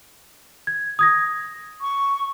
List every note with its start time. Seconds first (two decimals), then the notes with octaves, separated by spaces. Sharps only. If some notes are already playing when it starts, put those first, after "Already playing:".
0.67 G#6
0.99 D#6 G#6 A#6
1.81 C#6